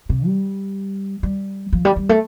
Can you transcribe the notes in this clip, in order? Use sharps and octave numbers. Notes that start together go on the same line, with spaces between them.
C3
G3
G3
F3
G3
G3
A3